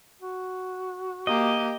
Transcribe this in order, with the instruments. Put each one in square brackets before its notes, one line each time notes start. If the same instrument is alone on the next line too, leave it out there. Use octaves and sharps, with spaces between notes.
[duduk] F#4
[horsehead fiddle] A#3 [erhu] G4 [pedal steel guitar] D#5